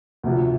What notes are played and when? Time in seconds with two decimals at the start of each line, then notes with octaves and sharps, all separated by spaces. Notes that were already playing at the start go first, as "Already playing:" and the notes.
0.23 D2 C3 F3